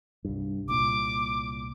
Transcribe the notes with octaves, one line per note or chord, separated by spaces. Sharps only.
C2 G2
C2 A#2 D6